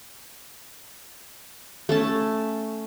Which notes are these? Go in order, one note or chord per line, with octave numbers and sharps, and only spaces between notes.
A3 C#4 A5